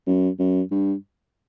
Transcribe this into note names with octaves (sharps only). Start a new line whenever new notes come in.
F#2
F#2
G2